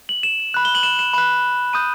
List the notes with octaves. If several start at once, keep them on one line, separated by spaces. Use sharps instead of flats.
F#7
E7
B5 F#6
G7
F#7
E7
E7
B5 F#6 E7
B5 D#6 G6 D#7